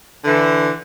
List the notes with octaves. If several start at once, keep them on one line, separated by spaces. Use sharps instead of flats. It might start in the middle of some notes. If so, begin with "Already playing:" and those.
D3 E3